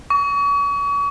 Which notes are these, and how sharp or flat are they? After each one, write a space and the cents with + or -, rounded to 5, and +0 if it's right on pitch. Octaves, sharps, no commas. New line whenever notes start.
C#6 +40